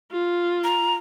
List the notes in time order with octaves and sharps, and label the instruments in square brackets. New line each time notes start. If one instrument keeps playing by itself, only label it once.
[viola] F4
[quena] A#5